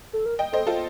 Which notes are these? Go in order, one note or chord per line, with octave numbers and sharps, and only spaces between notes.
A4
A#4
D#5 G5
A4 C5 D#5
F4 A4